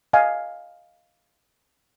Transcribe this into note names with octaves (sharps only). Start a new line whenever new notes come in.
D#5 F5 G#5